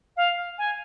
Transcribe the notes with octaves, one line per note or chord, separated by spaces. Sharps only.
F5
G#5